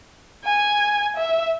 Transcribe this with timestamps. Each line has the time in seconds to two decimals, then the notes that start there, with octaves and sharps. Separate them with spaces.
0.45 G#5
1.17 E5